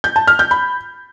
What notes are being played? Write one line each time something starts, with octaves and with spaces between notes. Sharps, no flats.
G6
A5
F6
G6
B5